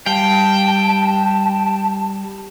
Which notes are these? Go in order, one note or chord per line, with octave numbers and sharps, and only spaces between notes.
G3 F5 G5 A5